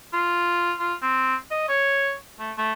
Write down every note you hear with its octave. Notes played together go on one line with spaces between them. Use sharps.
F4
F4
C4
D#5
C#5
A3
A3